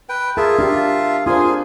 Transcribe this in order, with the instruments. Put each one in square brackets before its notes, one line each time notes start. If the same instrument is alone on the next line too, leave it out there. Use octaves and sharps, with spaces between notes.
[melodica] B4 G5
[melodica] F4 E5 A5 [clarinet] G#4 [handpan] A#4
[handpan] D4 G4 [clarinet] F5
[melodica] A#3 G#4 G#5 [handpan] D4 C5 [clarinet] F4